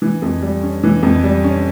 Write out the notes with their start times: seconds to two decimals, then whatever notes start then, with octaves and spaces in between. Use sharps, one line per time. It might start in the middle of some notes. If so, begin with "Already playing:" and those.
0.02 E3
0.22 F2
0.42 G3
0.62 C#4
0.83 E3
1.03 F2
1.24 G3
1.43 C#4